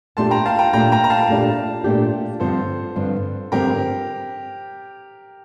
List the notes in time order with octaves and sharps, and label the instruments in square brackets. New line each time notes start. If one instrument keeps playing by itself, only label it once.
[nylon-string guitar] A#2 A3 D4 G4 [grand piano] A5 C6
[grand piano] G5 A#5
F5 A5
G5 A#5
[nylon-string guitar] A#2 A3 D4 G4 [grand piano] G5 A#5
[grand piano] G5 A#5
A#5
F5 A5
[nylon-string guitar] A#2 A3 D4 G4
A#2 A3 D4 G4
[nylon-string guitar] G2 D3 F3 C4 [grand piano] A4 C5
[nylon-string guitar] G2 D3 F3 C4
[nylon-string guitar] G2 D3 F3 C4 [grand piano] G4 A#4